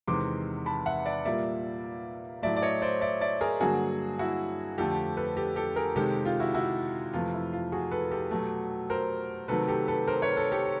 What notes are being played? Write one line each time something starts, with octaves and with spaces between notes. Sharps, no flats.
E2 C3 D#3 G#3 C6 D6
A5 B5
E5 F#5
D5 E5
A#2 G3 A#3 D5 E5
A2 F#3 A3 D5 E5
D5
C#5 D#5
C5 D5
D5 E5
D5 E5
G#4 A#4
G2 D3 F#3 A#3 F#4 G#4
E4 F#4
F2 D3 F3 A3 G4 A4
A4 B4
G4 A4
G4 A4
G#4 A#4
C3 D#3 G#3 G4 A4
F4 G4
E4 F#4
E4 F#4
F2 C3 E3 A3 F4
E4
F4
F#4 G#4
A4 B4
G4 A4
B2 F#3 A3
A#4 C5
C3 D#3 F#3 A3 A4 B4
G4 A4
A4 B4
A#4 C5
B4 C#5
A4 B4
G4 A4